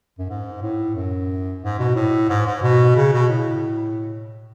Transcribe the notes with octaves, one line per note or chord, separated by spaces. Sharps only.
F#2
G#2
A2
F#2
G#2
B2
A2
G#2
G#2
B2
C#3
B2
A2